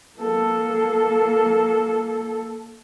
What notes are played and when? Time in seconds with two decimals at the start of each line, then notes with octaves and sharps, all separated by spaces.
0.18 A#3 A4